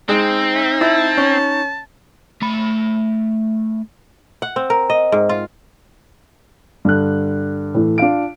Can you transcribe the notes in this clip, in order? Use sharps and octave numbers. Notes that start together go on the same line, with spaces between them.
G#3 C4 D#4
E5
E4 A5
C#4
A3 B5
F#5
C4
A#4
D#5
G#2
F4
G2 D3 F#6
A2 E3
D4 F4 F5 D7